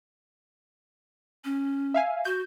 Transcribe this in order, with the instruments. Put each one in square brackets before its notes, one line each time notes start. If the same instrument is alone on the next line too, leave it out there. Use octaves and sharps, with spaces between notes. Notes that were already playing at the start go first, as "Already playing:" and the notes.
[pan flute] C#4
[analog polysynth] E5 F5 G#5
[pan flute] F#4 [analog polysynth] G6